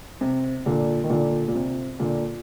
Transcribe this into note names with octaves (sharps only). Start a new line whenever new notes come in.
C3
A#2 D3
D#3
A#2 D3
A#2
C3
A#2 D3